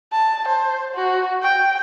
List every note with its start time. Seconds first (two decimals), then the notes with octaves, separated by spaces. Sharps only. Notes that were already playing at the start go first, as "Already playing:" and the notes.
0.13 A5
0.48 C5
0.95 F#4
1.42 G5